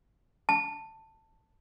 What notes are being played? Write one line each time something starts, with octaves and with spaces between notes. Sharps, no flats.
A5